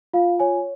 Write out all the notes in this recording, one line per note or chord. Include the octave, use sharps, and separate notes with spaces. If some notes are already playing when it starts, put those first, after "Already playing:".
F4 F5
C#5 G#5